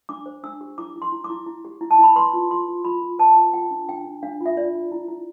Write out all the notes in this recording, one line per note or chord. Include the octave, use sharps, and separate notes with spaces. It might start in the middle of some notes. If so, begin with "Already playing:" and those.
D4 D6
C5
D4 E6
G4
E4 D6
E4
C6
E4
D6
E4
E4
G4
E4
A5
E4 B5
B4 C6
F4
F4 C6
F4
F4 B5
F4
B4 A5
F4
F4 G5
D4
D4 G5
D4
D4 F5
F4
E5
F4 D5
F4
E4
E4